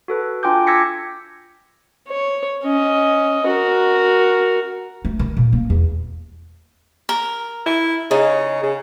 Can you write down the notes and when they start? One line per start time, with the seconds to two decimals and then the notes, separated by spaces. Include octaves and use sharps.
0.08 F#4 A4 B4
0.43 D4 F4 G5 G#5 D6 G6
0.67 D6 E6 G#6 A#6 B6 C#7
2.09 C#5
2.64 C#4 D#5
3.47 F#4 A#4
5.05 A3
5.19 D#3
5.37 A#2
5.53 A#3
5.70 E2
7.09 A#4
7.66 E4
8.11 C#3 D#4
8.63 C#3